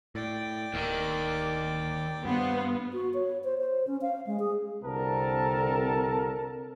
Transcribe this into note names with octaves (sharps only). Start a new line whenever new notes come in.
A2 D5 G5
D1 D#2 D#3
G2 B3 F4 C5
F#4
C#5
C5
C5
C#4
F5
G#3
G#4
C2 D3 C4 A4 A#4 A5